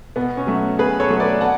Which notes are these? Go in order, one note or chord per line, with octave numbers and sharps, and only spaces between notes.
B2 B3
C#4
F#3 A3
B2 G#4 B4
A4 C#5
F#3 A3
B4 D5
B2 F#5 A5